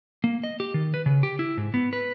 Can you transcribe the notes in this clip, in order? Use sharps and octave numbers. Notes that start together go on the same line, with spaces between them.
A#3
D#5
G4
D#3
B4
C#3
G4
E4
G#2
B3
B4